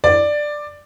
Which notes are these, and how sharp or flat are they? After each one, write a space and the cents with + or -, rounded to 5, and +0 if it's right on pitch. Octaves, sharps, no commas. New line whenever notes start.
D5 +10